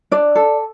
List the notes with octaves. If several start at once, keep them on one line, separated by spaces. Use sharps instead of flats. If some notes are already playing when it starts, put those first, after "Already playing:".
D4 D5
A4